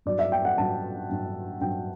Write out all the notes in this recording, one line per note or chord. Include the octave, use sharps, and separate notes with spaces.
G2 F#3 D5
E5
G5
F#5
G2 F#3 A5
G2 F#3
G2 F#3 G5